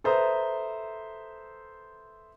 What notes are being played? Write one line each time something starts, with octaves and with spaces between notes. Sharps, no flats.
A4 B4 C5 E5 A#5 D#6